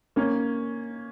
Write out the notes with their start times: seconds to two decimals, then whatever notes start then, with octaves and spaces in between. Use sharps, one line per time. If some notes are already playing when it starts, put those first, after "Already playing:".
0.16 A#3 C#4